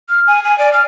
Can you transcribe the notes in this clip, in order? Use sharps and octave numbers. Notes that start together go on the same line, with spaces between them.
F6
G#5
G#5
D5
F6